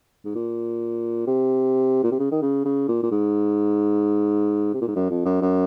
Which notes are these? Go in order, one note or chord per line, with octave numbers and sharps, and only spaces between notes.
G#2
A#2
C3
A#2
C3
C#3
D#3
C#3
C#3
A#2
A#2
G#2
C3
A#2
G#2
F#2
F2
F#2
F#2